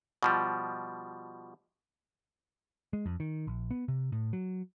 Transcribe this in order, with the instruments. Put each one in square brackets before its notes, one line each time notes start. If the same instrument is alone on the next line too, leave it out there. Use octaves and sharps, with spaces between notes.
[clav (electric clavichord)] B2 F3 G3
[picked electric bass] G#3
F2
D#3
A#1
B3
C3
A2
F#3